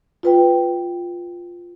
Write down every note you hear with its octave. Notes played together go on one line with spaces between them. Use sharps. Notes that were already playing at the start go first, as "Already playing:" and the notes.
F4 B4 G5